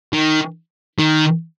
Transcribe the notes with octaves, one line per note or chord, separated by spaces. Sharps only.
D#3
D#3